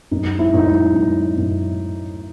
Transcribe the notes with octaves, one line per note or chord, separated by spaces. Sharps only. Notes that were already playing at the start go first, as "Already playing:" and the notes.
F#2 D#4
E4
F#2 D#4
E4
F#2
F#2